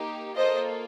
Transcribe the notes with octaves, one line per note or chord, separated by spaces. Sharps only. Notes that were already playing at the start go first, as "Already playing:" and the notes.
Already playing: A#3 D#4 G4
A#3 F4 A4 C5 D#5